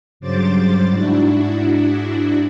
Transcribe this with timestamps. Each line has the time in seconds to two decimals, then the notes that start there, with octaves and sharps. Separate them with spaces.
0.20 G2 C#3 F#3 C5 D6 A6
0.88 G#2 D4 E4 F#4